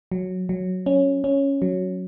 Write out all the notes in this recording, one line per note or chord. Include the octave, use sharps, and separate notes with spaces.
F#3
F#3
C#4
C#4
F#3